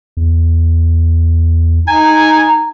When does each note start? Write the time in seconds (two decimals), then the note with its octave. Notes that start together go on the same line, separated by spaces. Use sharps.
0.17 E2
1.87 D#4 G#5 A#5